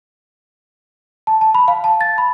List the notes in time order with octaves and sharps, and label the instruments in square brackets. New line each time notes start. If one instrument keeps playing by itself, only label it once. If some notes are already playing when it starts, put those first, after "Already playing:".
[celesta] A5
A5
B5
F5
A5
A6
B5